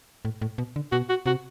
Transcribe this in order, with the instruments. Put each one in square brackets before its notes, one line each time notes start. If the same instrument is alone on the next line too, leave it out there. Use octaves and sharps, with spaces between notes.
[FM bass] A2
A2
B2
D3
[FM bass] B2 [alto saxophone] F#4
[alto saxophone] F#4
[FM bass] C3 [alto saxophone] F#4